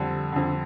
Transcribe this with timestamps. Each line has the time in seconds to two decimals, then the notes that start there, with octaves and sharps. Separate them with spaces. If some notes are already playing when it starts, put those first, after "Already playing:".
Already playing: F2 D3 G3
0.32 F2 D3